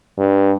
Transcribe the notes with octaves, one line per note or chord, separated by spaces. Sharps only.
G2